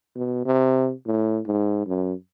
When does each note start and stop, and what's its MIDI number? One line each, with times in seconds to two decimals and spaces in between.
0.15 0.42 47
0.45 0.92 48
1.06 1.40 45
1.46 1.86 44
1.87 2.13 42